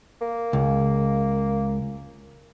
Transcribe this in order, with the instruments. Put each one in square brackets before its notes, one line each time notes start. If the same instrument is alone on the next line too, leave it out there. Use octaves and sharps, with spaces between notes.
[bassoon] A#3
[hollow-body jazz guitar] C#2